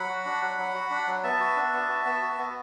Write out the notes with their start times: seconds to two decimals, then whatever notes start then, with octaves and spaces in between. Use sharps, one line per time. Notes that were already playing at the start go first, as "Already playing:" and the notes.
Already playing: F#3 F#5 B5
0.09 F#4
0.25 D4
0.42 F#3
0.58 F#3
0.75 F#4
0.90 D4
1.07 F#3
1.23 B3 E5 A5
1.40 F#4
1.56 D4
1.73 B3
1.89 F#4
2.05 B3
2.22 F#4
2.39 B3